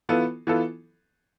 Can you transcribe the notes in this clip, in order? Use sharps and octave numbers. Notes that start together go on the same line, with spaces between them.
E3 B3 F4 A4
E3 B3 F4 A4